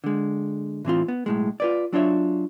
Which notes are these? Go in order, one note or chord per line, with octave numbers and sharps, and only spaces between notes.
D3 G#3
A2 E3 C4 F4
B3
B1 A2 G#3
F4 B4 D5
F#3 D4 F4 C#5 E5